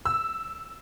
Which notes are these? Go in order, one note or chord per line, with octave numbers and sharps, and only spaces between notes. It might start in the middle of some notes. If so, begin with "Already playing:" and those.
E6